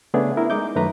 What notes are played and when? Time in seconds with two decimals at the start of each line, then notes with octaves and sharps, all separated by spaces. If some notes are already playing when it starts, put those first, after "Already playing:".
0.14 C#3 A3 B3 D4 G#4
0.37 E4 A#4
0.50 G#3 D#4 D6 G6
0.76 F#2 D#3 A3 B4 A#5